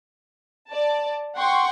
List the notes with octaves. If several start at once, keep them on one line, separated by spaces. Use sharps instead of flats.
D5 A5
F#5 G5 C6 C#6